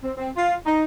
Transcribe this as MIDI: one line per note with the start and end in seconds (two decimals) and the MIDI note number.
0.04 0.12 60
0.17 0.29 60
0.36 0.54 65
0.66 0.84 63